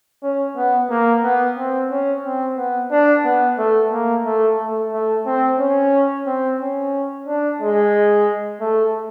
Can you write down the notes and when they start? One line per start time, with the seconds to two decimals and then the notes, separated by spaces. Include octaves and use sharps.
0.23 C#4
0.56 B3
0.90 A#3
1.23 B3
1.58 C4
1.90 C#4
2.24 C4
2.57 B3
2.91 D4
3.24 B3
3.58 A3
3.92 A#3
4.25 A3
4.58 A3
4.92 A3
5.26 C4
5.59 C#4
6.26 C4
6.60 C#4
7.27 D4
7.60 G#3
8.60 A3